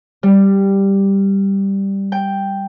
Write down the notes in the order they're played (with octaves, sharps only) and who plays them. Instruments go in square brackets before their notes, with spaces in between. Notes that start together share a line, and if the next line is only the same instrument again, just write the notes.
[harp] G3
G5